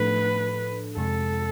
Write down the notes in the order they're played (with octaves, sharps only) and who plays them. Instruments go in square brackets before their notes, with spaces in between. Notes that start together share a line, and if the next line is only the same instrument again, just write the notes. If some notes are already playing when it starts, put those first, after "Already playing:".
Already playing: [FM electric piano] A2 F3 A3 D4 A4 [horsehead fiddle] B4
[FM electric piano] F2 C3 G#3 [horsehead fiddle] A4